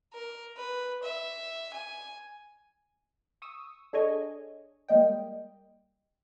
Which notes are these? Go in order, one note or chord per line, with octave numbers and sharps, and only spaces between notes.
A#4
B4
E5
G#5
C#6 D#6 E6
D4 G#4 A4 C#5 D#5 G#5
G3 G#3 A#3 D#5 G5